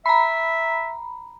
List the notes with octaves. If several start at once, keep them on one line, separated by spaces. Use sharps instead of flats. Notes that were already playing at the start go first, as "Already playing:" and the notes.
E5 A#5 B5